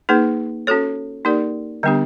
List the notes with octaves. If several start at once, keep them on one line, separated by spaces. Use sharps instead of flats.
A#3 D#4 G#4 B4
C#4 F#4 A4 C#5
A#3 D#4 G4 A#4 D5
D3 G3 B3 D4 G4